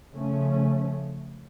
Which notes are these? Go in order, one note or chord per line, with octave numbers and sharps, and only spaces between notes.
C#3 F3 A3 C#4